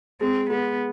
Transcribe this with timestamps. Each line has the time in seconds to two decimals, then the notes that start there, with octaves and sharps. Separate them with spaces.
0.21 G#3 C4
0.50 G#3 B3